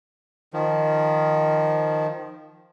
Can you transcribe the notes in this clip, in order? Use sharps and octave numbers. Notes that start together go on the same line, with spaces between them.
D#3 F3